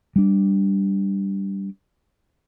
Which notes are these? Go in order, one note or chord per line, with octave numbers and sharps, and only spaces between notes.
G3 D4